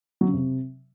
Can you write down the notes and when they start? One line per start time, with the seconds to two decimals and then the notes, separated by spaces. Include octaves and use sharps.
0.21 F#3
0.27 C#3
0.34 C3